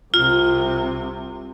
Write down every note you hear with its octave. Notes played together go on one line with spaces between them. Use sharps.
C2 C3 F4